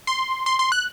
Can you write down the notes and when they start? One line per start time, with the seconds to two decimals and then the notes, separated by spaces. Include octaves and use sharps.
0.07 C6
0.46 C6
0.59 C6
0.72 F#6